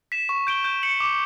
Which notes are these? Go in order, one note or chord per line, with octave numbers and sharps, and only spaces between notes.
B6 E7
C#6
G6 D7 G7
G6
C#7 F#7
D6